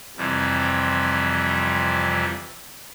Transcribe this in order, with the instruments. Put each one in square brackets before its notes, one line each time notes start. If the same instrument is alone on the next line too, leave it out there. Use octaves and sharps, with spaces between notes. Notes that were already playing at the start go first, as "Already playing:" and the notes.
[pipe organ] F2 C3 E3 G3